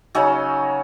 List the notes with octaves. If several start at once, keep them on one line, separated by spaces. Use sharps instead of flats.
C#3 F#3 C#4 D#4 D#5